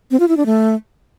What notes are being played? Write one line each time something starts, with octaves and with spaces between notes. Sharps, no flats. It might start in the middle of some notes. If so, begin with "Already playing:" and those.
C4
F4
E4
D4
A3